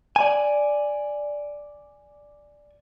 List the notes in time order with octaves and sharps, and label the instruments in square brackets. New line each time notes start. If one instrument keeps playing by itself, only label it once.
[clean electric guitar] D5 G#5